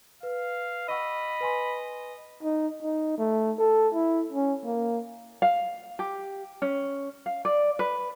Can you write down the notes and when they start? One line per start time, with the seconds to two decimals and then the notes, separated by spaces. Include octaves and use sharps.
0.23 B4 F5
0.89 D#5 F#5 B5 C#6 E6
1.41 B4 G#5 C6
2.43 D#4
2.83 D#4
3.18 A3
3.59 A4
3.93 E4
4.33 C#4
4.65 A#3
5.42 F5
5.99 G4
6.62 C#4
7.26 F5
7.45 D5
7.79 B4